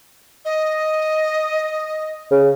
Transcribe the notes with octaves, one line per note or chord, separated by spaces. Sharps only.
D#5
C#3